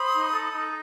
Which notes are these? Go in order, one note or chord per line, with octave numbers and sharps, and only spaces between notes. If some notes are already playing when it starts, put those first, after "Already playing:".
Already playing: C5 B5 D#6
D#4
A4
D#4